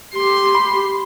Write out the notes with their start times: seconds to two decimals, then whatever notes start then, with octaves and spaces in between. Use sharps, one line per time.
0.14 G4 C6
0.55 B5